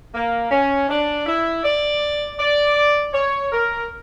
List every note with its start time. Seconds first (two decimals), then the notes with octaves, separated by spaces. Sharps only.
0.14 A#3
0.51 C#4
0.89 D4
1.26 E4
1.63 D5
2.38 D5
3.13 C#5
3.51 A#4